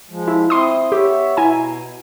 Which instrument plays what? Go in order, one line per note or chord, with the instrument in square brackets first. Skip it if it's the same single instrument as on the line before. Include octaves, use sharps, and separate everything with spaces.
[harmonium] F3 G#3
[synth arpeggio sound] E4
[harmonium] C4 E4 [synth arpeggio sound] C6 D#6
[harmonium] B3 C#5 E5 [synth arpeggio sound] G4
[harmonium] B2 [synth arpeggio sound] E4 G#5 A#5